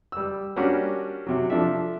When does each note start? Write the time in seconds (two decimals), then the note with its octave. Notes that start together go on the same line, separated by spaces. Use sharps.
0.12 G3 E6
0.56 G3 A#3 C#4 D4 F#4
1.27 C3 F#3
1.50 F3 D4 A4 E5